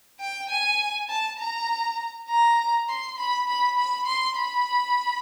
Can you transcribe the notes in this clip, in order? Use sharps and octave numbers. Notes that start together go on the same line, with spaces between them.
G5
G#5
A5
A#5
A#5
C6
B5
B5
B5
C6
B5